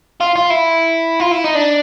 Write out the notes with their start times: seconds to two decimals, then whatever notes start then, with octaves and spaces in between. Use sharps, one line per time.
0.21 F4
0.36 F4
0.50 E4
1.20 F4
1.31 E4
1.44 D#4
1.55 D4